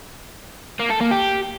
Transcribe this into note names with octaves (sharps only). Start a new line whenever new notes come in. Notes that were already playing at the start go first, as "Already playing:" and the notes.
A#3
A4
A#3
G4